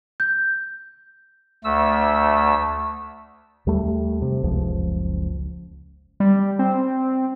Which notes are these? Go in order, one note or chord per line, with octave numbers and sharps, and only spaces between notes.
G6
D2 A3 E6
D#2 G3 A3
C3
F#1 C#2 F3
G3
C4